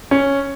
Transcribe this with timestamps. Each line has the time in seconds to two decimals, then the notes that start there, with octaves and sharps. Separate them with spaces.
0.11 C#4